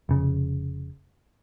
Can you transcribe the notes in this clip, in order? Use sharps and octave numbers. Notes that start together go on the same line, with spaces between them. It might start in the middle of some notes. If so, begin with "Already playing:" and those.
F1 C#3